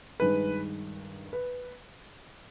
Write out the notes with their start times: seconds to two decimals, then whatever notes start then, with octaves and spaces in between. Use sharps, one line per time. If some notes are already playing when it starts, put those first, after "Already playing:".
0.20 G2 D#3 G#3 B4
1.33 B4